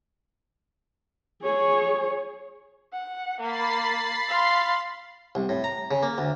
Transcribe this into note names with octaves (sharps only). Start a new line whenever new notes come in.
G#4 C#5
F#5
A#3 B5 A6 C7
F5 C6
C2
A2
A#5
C#3
A#3
D2